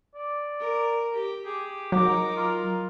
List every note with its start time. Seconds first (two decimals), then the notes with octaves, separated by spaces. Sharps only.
0.15 D5
0.60 A#4
1.14 G4
1.45 G4 G#4
1.92 F#3 D#4 A#4 D6
2.37 F4